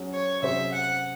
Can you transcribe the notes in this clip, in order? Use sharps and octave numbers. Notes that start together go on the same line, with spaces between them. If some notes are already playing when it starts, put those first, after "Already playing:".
Already playing: F#3 C#4 G#4
C#5
C3 F#3 C#4 G#4 C5 E5
F#5